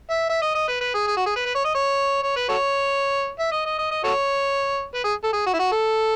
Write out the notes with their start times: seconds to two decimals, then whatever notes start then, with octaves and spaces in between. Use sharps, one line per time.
0.10 E5
0.29 E5
0.42 D#5
0.55 D#5
0.68 B4
0.81 B4
0.94 G#4
1.07 G#4
1.16 F#4
1.26 G#4
1.36 B4
1.46 B4
1.55 C#5
1.65 D#5
1.75 C#5
2.23 C#5
2.36 B4
2.49 F#4 A4 C#5
3.39 E5
3.52 D#5
3.66 D#5
3.79 D#5
3.91 D#5
4.04 F#4 A4 C#5
4.95 B4
5.04 G#4
5.24 A4
5.33 G#4
5.46 F#4
5.54 E4
5.59 F#4
5.72 A4